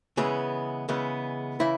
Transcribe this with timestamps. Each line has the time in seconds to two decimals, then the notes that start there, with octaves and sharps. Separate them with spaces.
0.17 C#3 E3 G#3 B3 G#4
0.89 C#3 E3 G#3 B3
1.60 C#3 E3 E4